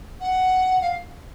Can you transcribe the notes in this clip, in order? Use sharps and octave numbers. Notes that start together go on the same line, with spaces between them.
F#5
F5